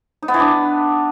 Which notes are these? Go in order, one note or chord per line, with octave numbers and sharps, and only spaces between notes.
D#4
B3
E3
D4